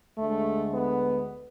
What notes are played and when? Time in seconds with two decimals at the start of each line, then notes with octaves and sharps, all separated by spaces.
0.17 D2 D3 G#3 A3
0.73 B3